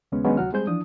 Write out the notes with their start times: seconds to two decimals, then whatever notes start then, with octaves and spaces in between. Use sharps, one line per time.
0.12 D#2 C#3 G#3 B3 C#4
0.24 D#3 F#3 G#3 B3 C#4 D4
0.37 D2 C3 F#3 F#4 F#5 F6
0.53 G3 G#3 C4 G#4 C5 G6
0.67 E3 F3 D4 D#6